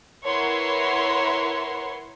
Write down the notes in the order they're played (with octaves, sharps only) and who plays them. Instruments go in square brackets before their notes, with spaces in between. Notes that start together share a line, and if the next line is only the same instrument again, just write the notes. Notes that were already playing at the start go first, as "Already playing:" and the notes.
[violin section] E4 A#4 B4 C#5 F#5 C6